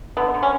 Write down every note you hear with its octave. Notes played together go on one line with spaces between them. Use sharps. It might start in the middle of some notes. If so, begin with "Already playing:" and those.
D3 B3
D3
C#4